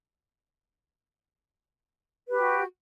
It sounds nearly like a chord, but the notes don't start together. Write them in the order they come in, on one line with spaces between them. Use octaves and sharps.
B4 G4 F#4